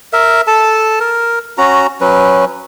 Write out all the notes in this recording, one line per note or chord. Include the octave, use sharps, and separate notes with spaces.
A#4 E5
A4 A5
A#4
C#4 F#4 A#5
F#3 C#4 B4